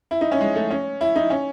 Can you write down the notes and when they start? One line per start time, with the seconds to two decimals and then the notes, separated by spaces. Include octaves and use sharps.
0.11 E4
0.21 D#4
0.32 C#4
0.41 G#3
0.55 A3
0.70 C#4
1.01 E4
1.16 D#4
1.30 C#4